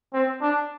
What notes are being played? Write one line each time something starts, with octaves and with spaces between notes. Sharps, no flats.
C4
D4